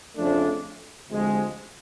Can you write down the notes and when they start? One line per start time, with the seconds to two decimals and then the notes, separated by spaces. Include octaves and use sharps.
0.17 F2 C#3 F3 A3 D4
1.09 D2 C3 F3 G#3